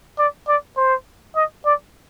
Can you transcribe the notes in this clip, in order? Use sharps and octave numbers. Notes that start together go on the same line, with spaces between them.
D5
D5
C5
D#5
D5